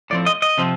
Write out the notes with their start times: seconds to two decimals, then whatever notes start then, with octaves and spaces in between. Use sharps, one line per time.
0.10 A2 F3 C4 D5
0.26 D#5
0.42 D#5
0.58 C3 F3 C4